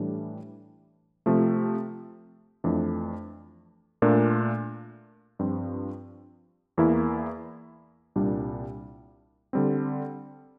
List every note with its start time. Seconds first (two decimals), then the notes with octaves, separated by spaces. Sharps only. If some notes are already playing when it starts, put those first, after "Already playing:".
Already playing: A2 E3 G3 D4
1.26 C3 F3 A3
2.64 F2 E3 A3 D4
4.02 A#2 A3 D4 F4 A#4
5.39 G2 F3 C4 F4
6.78 E2 E3 A#3 E4
8.16 C2 A#2 G3 D4
9.53 D3 G3 C4